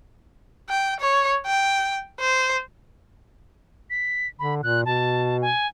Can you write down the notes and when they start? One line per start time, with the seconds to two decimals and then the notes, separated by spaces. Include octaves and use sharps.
0.69 G5
1.00 C#5
1.46 G5
2.21 C5
3.90 B6
4.39 D3 B5
4.63 A#2 F#6
4.86 B2 A5
5.41 G#5